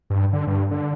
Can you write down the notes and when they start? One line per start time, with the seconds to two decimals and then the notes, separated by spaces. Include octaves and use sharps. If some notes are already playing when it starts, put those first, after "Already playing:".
0.10 G2
0.33 D3
0.47 G2
0.71 D3